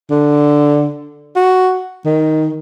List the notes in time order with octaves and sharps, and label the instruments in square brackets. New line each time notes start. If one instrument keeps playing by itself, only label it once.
[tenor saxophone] D3
F#4
D#3